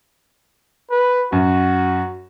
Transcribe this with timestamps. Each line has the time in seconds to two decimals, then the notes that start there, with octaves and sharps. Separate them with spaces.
0.91 B4
1.32 F#2 F#4